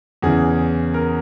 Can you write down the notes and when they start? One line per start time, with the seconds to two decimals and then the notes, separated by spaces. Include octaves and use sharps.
0.22 E2 C#3 E3 G#4
0.94 A#4